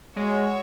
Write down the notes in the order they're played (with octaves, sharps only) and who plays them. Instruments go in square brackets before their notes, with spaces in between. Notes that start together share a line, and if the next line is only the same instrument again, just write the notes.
[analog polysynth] G#3 [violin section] F#4 C#5 E5